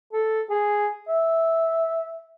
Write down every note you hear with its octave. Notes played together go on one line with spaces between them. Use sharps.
A4
G#4
E5